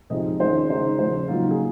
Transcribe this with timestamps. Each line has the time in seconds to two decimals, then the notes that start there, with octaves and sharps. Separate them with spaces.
0.10 C3 F3 G#3 C4 D#4 D#5
0.40 D#3 G#3 C#4 C5
0.70 C#3 G#3 D#4 C5
0.99 C#3 F3 G#3 C5
1.28 C#3 F#3 A#3 D#4 F4
1.51 G#4